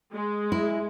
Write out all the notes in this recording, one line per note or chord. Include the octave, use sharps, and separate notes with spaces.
G#3
E4